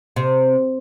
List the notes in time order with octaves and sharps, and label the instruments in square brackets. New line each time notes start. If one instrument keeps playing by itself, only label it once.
[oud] C3